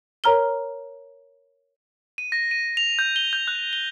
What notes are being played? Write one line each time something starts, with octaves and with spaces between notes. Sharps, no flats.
A#4 C#5 A#5 F6 G7
D#7
A#6
D#7
F7
G6
G7
G6
F#6
G7